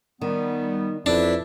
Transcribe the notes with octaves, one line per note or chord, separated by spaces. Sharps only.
D#3 G3 B3
F2 D4 E4 B4 E5